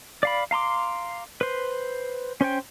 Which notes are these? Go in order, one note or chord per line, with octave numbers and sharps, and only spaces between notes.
D5 F5 B5
F5 A#5 C6 D6
B4 C5
C#4 C5 C#5 G5